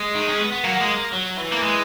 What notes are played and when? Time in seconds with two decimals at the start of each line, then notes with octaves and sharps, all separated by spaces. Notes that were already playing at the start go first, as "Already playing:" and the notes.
Already playing: G#3
0.15 D#3
0.28 C#4
0.40 B3
0.52 B3
0.64 F#3 A#3
0.81 G#3
1.13 F#3
1.38 E3
1.52 A#3
1.63 G#3